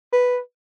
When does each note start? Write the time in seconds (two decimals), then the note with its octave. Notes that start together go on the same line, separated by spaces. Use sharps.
0.13 B4